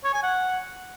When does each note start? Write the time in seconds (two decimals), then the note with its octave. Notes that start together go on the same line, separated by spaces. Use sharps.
0.04 C#5
0.14 G#5
0.23 F#5